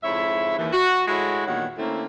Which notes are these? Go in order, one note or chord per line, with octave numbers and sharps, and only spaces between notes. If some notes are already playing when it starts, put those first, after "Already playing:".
F2 G#2 E4 C#5 E5
D#2 E3
F#4
A2 G#3 E4 F#4
E2 G2 A#2 D#3 C#5 F#5
D3 A3 A#3 C4 C#4 E4